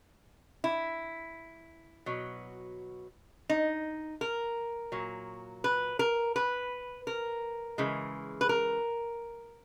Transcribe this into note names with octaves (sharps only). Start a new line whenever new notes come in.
E4
B2 F#3
D#4
A#4
A#2 F#3
B4
A#4
B4
A#4
C#3 E3 G#3
B4
A#4